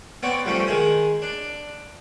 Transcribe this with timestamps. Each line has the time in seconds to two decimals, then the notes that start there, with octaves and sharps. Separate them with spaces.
0.23 B3 C4 C#5 D5
0.45 G2 F3 A3 C4 C#4
0.67 D#3 G#3 G#5 D#6
1.22 D4